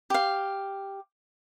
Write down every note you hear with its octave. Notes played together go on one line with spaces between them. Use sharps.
G4 F5